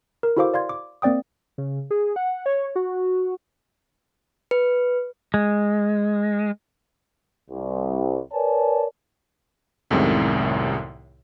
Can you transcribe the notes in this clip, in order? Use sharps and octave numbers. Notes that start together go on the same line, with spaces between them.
A#4
E4 F#4 A4 C5 F5 D6
D5 F5 C6 G#6
D6
A#3 C4 D5 G5 D#6
C#3
G#4
F#5
C#5
F#4
B4
G#3
C2
A#4 B4 C#5 D5 G#5 A5
C2 F#2 A2 C3 D#3 G#3